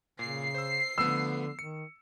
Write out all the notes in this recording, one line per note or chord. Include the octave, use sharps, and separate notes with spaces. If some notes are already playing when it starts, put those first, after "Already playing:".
A#2 C#3 C7
C5 E6
D3 F3 A3 B3 E6
D#3 C#7